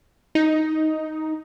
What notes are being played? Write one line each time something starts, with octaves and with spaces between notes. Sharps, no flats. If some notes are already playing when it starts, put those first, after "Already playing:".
D#4